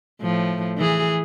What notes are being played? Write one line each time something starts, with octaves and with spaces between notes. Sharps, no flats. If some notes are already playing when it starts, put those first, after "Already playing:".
A2 F3
E3 G#4